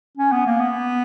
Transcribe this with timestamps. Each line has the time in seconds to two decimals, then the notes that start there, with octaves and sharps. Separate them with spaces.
0.18 C#4
0.32 B3
0.47 A#3
0.60 B3